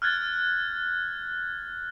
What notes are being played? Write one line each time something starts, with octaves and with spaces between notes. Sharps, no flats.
F6 F#6 G#6 A6